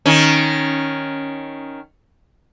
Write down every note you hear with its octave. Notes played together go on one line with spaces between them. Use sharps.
D#3 C#4